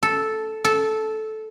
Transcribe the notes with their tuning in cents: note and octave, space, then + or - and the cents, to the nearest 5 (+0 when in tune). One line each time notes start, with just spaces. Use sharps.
A4 -5
A4 -10